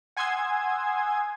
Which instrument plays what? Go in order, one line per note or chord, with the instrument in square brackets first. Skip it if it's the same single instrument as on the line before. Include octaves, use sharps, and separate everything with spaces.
[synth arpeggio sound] F#5 G#5 C6 D#6 E6 G#6